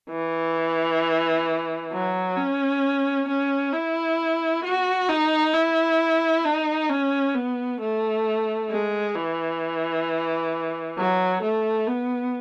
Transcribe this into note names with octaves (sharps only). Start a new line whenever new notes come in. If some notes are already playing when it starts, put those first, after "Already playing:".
E3
F#3
C#4
C#4
E4
F#4
D#4
E4
D#4
C#4
B3
A3
G#3
E3
F#3
A3
B3